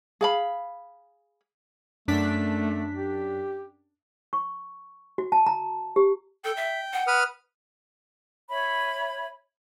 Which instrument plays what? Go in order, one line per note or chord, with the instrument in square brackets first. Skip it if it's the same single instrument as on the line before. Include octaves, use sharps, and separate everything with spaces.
[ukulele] G#4 F5 B5
[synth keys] F#2 D4 B6 [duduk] A3
[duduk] G4
[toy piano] C#6
F#4
A5
A#5
G4
[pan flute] A4 [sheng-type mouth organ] G5
[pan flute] E5
F#5
[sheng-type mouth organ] B4 D#6 F6
[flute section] C#5 E5 B5